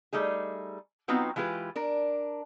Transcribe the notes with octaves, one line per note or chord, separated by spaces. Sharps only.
G3 A3 D#4 G#4
F#3 B3 C4 D#4 F4 F#4
E3 G#3 F4 G4 B4
D4 A#4